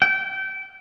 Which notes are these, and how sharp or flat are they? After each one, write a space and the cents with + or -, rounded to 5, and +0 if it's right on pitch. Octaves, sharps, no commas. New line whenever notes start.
G5 -25